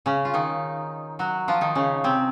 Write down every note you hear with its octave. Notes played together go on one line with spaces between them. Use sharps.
C#3 C#4
F4
D#3 D#4
F#3 F#4
F3 F4
D#3 D#4
C#3 C#4
C3 C4